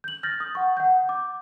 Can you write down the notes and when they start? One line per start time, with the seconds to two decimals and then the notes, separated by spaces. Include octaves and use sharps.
0.04 G6 F#7
0.23 F6 G6 A6 A#6
0.40 D#6
0.55 F#5 C#6
0.77 F#5 G6
1.09 D6